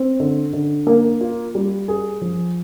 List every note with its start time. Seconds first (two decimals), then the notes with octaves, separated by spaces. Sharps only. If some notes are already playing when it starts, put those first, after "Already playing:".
Already playing: C4
0.20 D3
0.53 D3
0.87 A#3
1.21 F4
1.55 G3
1.88 G#4
2.21 F3